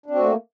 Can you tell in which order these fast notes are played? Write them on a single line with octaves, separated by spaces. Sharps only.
D4 C4 F#4 A3 A#3